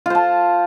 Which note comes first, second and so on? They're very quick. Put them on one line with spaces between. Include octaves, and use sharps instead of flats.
F4 C5 A5